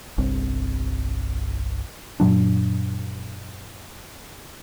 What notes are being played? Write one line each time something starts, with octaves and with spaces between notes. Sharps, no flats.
G1 C2 C4
F#2 A#2 F#3 D4